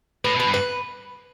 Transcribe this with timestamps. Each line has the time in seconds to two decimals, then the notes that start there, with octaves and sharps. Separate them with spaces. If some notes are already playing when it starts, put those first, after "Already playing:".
0.24 A2 B4
0.36 B2 B4
0.47 G2
0.54 B4